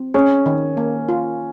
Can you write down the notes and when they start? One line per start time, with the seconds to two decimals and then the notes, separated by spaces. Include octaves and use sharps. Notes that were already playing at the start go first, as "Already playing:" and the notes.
Already playing: C4
0.14 C#4 G#4
0.46 D#3
0.77 A#3
1.09 F4